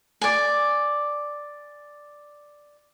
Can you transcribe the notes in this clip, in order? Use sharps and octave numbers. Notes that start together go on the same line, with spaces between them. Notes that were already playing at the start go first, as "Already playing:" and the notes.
D5 G#5